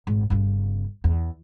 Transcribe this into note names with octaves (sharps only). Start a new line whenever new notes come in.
G#1
G1 C#3
E2